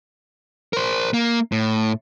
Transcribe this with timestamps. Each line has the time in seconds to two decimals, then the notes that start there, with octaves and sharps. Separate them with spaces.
0.73 A#4 C5
1.14 A#3
1.52 A2